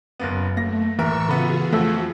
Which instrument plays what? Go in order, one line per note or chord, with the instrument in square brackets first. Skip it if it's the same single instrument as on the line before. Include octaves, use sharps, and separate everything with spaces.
[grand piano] F#1 A#3 B3 [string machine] F#2
[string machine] A3 [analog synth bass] A#3 [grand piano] A#6
[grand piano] D1 A#4 E5 [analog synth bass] E3 [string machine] C#6 E6
[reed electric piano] C#3 B5 [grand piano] B3 A4 [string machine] F4 F#4 G#4
[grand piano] F2 [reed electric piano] A3 E6